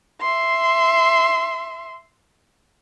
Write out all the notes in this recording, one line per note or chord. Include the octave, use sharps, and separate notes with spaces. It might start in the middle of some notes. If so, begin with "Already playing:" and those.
E5 C6